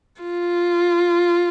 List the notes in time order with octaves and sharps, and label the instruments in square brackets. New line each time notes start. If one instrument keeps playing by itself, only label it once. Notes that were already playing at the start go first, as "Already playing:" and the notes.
[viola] F4